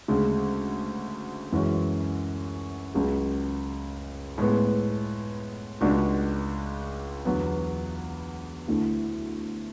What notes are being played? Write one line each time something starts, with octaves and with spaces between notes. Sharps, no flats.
D2 C#3 G#3
F#2 E3 G#3 C#4 F#4
C#2 C#3 F#3 C#4 G#4
A2 G#3 B3
C#2 C#3 G#3 D4 F#4
E2 D3 F#3 B3
D2 D3 A3 E4